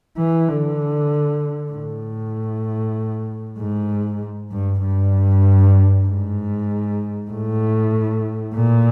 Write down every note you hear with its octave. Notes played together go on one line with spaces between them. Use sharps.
E3
D3
A2
G#2
G2
G2
G#2
A2
A#2